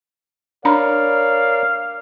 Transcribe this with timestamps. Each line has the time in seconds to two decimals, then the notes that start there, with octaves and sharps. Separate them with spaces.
0.65 D4 A#4 C#5 D5 F5 A#5 B5